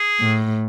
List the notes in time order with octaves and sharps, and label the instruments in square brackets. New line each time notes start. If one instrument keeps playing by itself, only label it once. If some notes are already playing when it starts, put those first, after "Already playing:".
Already playing: [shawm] G#4
[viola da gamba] A2